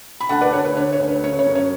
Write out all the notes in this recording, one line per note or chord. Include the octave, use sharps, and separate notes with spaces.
B5
D2 F#5 A5
B4 D5
D2 C#5
B4
D3 C#5
C#5
D2
B4
C#3 C#5
C#5
F#2
C#5